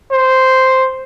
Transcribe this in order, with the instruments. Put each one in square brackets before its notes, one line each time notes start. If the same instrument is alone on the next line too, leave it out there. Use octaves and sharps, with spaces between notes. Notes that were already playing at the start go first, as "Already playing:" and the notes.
[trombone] C5